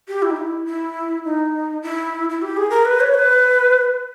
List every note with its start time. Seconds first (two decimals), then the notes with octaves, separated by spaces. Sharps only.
0.08 G4
0.22 E4
0.30 D#4
0.36 E4
0.66 E4
1.25 D#4
1.82 E4
2.29 E4
2.42 G4
2.57 G#4
2.70 A#4
2.85 B4
3.00 C#5
3.14 B4